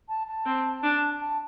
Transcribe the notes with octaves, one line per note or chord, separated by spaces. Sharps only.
A5
A5
C4
D4
A5